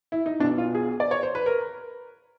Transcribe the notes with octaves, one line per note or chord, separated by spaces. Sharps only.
E4
D#4
B1 B2 D4
F4
G#4
D5
C#5
C5
B4
A#4